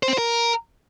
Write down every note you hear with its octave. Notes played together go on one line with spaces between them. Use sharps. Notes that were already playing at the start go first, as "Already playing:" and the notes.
C5
C4
C5
A#4